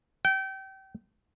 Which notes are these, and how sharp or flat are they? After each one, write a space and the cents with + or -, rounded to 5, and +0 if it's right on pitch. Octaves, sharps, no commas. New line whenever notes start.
G5 -30